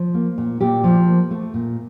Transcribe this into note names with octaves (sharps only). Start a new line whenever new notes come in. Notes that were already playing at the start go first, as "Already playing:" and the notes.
Already playing: F3
A#3
A#2
A#2 G4
F3
A#3
A3
A#2